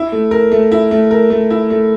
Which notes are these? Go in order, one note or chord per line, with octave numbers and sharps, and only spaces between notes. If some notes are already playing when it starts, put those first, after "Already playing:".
Already playing: E4
A3
A#4
A3
E4
A3
A#4
A3
E4
A3